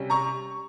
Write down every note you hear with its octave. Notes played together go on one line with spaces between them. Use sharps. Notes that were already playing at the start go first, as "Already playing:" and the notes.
Already playing: C3 G3 C#4
A#5 C#6